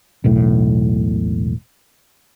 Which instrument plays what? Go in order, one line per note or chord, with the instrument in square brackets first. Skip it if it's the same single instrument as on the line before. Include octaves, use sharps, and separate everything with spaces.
[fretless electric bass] E1 B1 A2